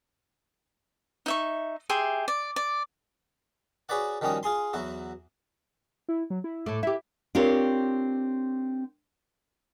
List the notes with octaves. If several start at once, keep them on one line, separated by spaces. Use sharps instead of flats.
D#4 E5 C#6
G4 G#4 E5 C6
D5
D5
F#4 G#4 B4 C#5 D5 F#5
D#3 F3 G3 C#4 F#4 D#6
F4 G#4 G#5 C6
E2 F#3 E4 F#4
E4
F#3
E4
A2 A3 D6
E4 G4 E5
C4 D4 F4 G4 A#4 C#5